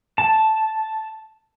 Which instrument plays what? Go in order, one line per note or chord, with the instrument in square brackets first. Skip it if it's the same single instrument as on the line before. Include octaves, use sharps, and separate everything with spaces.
[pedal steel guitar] A5